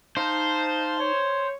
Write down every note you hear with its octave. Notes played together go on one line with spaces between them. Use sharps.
D#4 C5 F5 A5
C#5